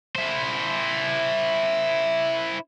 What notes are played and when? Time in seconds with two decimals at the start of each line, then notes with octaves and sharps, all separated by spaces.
0.16 E4 C5